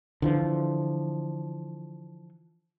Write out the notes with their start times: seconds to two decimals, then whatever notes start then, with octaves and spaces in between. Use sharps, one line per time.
0.22 D3 E3 F3